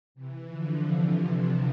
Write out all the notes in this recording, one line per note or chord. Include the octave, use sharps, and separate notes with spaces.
C3 E3
D3 F3
C3 E3
D3